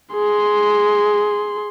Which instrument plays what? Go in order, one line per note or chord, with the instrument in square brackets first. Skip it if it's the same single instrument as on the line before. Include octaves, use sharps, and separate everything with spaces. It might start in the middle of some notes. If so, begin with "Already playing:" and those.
[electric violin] G#4 C6